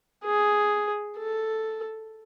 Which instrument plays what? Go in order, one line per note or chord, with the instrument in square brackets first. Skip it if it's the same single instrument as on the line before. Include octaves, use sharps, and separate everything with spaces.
[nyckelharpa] G#4
A4